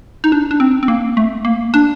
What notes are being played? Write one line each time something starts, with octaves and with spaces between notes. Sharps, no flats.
D#4
D4
D4
C4
C4
A#3
A3
A#3
D4